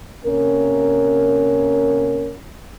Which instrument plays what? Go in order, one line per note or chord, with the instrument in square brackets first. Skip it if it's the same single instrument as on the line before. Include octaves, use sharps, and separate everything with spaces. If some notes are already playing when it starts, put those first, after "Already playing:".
[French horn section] C3 A#3 C#4 A#4